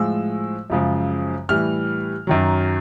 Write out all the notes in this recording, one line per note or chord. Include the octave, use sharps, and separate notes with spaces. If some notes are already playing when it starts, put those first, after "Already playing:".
Already playing: A2 F3 G#3 E6
F#2 C#3 F3 G#3
A2 E3 G3 F6
F#2 D#3 F#3